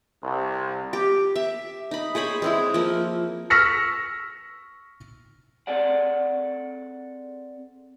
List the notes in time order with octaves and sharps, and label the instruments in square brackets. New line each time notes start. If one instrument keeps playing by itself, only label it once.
[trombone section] C2
[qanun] G4
E5
D#4 B5
G#4 C5 C#5 B5
G#3 C4 E4
F3 A#3
[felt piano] C#6 E6 F6 A#6 B6 C#7
[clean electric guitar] C4 G#4 A4 D5 F#5